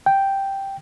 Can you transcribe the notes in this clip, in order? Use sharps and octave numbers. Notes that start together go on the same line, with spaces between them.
G5